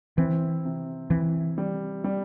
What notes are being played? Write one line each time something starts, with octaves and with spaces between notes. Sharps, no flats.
E3 C4
C3
E3 C4
G3
G3